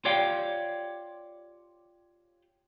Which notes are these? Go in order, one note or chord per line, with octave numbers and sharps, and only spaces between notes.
F4 G4 C#5 D5 F5 G5